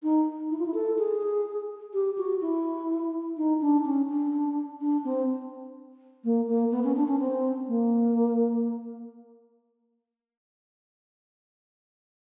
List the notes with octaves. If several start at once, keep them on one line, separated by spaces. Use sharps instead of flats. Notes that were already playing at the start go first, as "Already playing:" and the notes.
D#4
E4
F4
E4
A4
G#4
G4
F#4
E4
D#4
D4
C#4
D4
D4
C4
A#3
A#3
B3
C#4
D4
C#4
C4
A#3